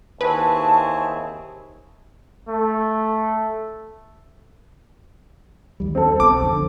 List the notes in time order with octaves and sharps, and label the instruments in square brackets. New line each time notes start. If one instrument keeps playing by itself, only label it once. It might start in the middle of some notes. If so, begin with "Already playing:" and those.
[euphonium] D#2 [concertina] C4 E4 G#4 [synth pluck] B4 [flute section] A5 C#6
[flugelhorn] A3
[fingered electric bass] D#2 G3
[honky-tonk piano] C4 A4
[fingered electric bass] B1 B3 [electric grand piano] D6
[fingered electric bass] F2 D3